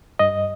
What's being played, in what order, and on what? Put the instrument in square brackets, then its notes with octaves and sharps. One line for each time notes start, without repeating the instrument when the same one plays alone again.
[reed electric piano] G2 D#5